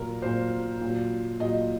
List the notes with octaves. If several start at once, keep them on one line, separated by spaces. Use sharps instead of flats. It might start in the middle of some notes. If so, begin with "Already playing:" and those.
Already playing: A#2 F#3 A#4
A#2 F#3 C5
A#2 F#3
A#2 F#3 D#5